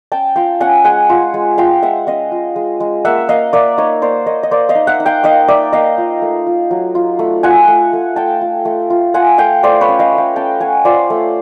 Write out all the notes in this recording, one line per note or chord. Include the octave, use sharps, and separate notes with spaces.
C#4 G5 A5
F4 F5 G5
C#4 F#5 G#5
G#3 F#5 G#5
F4
G#3
F4 F5 G5
G#3 E5 F#5
C#4 D#5 F5
F4
G#3
G#3
A#3 E5 F#5
A#3 D#5 F5
A#3 D5 E5
D#4 C#5 D#5
A#3 C5 D5
A#3 C#5 D#5
D#5
A#3 C5 D5
D#5 F5
D#4
E5 F#5
D#4
F5 G5
D#4 D#5 F5
D#4 D5 E5
A#3 D#5 F5
F4
A3
F4
F#3
F4
A3
F4 F#5 G#5
A3
A3
F4 G5 A5
F4
A3
F4
F4 F#5 G#5
A3 F5 G5
A3 C5 D5
B4 C#5
C#4
D#5 F5
A3
F5 G5
C#4 G5 A5
C#4 F#5 G#5
F4 C5 D5
A3